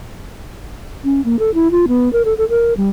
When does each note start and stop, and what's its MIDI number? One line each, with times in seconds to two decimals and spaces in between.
1.04 1.23 61
1.25 1.39 58
1.39 1.53 69
1.54 1.71 64
1.71 1.86 65
1.88 2.11 59
2.13 2.22 70
2.25 2.34 69
2.38 2.48 69
2.49 2.73 70
2.77 2.90 55